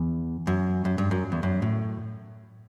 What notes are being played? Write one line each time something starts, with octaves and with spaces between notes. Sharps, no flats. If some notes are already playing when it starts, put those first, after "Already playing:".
Already playing: E2
F#2
F#2
G2
F#2
E2
F#2
A2